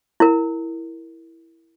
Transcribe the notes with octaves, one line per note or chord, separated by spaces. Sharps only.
E4 A#4